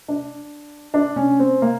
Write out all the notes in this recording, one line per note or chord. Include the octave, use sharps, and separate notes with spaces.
D4
D4
C#4
C4
A#3